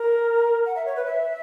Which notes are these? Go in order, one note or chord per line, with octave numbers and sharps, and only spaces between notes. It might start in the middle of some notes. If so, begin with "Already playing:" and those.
Already playing: A#4
F#5
E5
C#5
B4
E5